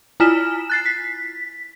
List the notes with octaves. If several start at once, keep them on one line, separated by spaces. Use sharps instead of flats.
E4 F4 G#5 F6 B6 E7
F#6 A6 C7
B6